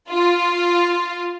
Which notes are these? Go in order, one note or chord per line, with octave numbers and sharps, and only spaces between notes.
F4